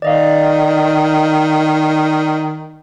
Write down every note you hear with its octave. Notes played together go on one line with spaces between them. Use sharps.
D#3 D5 D#5 F5